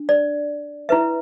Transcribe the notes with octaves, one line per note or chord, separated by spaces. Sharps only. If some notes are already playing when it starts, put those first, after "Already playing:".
Already playing: D4
D5
E4 B4 E5